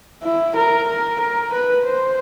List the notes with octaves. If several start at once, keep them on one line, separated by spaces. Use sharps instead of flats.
E4
A#4
A#4
A#4
B4
C5